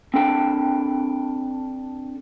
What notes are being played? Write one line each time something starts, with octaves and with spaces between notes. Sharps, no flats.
C4 D4 A4 G5 A5